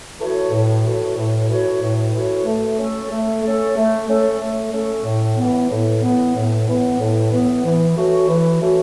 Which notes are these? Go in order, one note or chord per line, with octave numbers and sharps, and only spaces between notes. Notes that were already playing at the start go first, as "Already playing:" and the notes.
E3 A3 F#4 C#5
A2
E3 A3 F#4 C#5
A2
E3 A3 F#4 C#5
A2
E3 A3 F#4 C#5
A3
C#4 A4
A3
C#4 A4
A3
C#4 A4
A3
C#4 A4
A2
E3 B3
A2
E3 B3
A2
E3 B3
A2
E3 B3
E3
A3 C#4 F#4
E3
A3 C#4 F#4